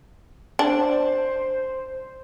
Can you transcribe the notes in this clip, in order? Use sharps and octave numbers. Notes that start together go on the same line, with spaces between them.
D4 C5